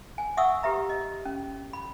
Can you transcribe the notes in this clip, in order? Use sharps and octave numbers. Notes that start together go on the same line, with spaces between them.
G#5
E5 F#5 C#6 D#6 E6
G4 B4 E5 A#5
D#5
C#4
B5